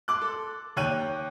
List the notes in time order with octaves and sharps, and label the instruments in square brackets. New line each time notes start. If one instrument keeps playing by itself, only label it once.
[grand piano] C6 D6 F#6
A4
D#2 C#5 G5 F#6 D#7